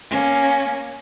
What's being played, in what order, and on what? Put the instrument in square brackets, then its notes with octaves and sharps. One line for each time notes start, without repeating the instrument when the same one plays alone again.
[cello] A#3 C#4